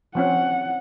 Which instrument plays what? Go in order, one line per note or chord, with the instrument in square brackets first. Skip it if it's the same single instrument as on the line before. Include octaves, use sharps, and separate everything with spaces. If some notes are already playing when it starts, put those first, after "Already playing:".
[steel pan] F3 C4 C#4 [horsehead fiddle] F#5